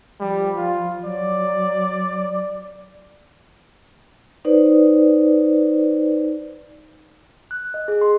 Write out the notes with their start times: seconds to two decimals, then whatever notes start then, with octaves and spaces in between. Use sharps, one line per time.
0.20 F3 G3
0.57 F4
1.04 F#3 D5
4.45 D#4 B4 C5 D5
7.51 F#6
7.74 D#5
7.88 G#4
8.01 C6